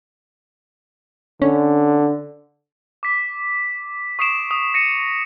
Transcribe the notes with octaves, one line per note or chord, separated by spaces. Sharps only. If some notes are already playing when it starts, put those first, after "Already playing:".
D3 C#4
D6 B6
C#6 D#6 C7 D7 E7
D#6
A#6 C#7 D#7